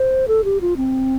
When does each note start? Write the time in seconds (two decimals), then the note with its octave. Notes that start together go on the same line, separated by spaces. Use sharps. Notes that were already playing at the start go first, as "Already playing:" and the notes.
Already playing: C5
0.28 A4
0.44 G4
0.61 F4
0.77 C4